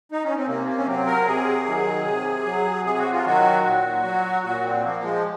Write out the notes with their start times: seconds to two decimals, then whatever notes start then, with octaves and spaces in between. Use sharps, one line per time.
0.12 D#4
0.24 C#4
0.35 C4
0.47 C3 A#3
0.67 A#3
0.78 C#4
0.86 F#3 C4
1.06 A#4
1.26 C3 G#4
1.66 D#3 F#3
2.05 C3
2.45 F#3
2.84 C3 G#4
2.98 F#4
3.12 F4
3.24 D#3 F#3 F#4
3.64 A#2
4.04 F#3
4.43 A#2 F#4
4.64 C4
4.83 F3 A#3
5.03 G#3